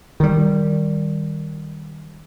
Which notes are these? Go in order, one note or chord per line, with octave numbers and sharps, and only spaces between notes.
D#3 G3